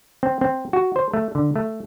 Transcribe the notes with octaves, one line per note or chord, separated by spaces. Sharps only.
C4
C4
F#4
C5
A3
D3
A3